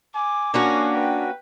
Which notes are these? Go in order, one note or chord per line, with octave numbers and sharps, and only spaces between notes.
G#5 D6
A#3 C#4 D4 F#4 G#5
B4 G5